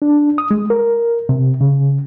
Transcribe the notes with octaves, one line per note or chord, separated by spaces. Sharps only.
D4
D#6
G#3
A#4
C3
C#3